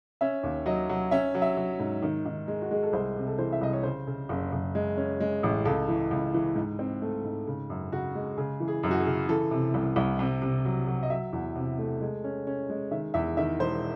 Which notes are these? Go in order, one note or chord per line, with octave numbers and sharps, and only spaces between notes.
C#4 E5
D#2
F#3 D#5
F#3
C#4 E5
F#3
E5
F#3
G#2
D#3
D#3
G#3
F#4
G#3 G#4
A4
C2 C5
C3
A4
E3 C5
E5
C2 D#5
C#5
C#3 C5
C#3
F#1
F#1
G#3
C#4
G#3
A1
C#2 A4
E3
C#2
E3
G#2
C4
A3
G#2
C#3
F#2
C#3 F#4
G#3
C#3 G#4
E3
G#4
F#2
F#4
G#4
C#3
E3 A4
C3
C2
C2
C3
C3
F#3
F#3
D#5
F#3 E5
E2
C3
A3
G#3
C#4
C#4
G#3
D#3 E5
E2 E5
D#3 E5
E1 C5